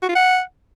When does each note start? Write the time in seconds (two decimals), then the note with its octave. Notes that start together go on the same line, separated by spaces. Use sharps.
0.02 F#4
0.09 F4
0.15 F#5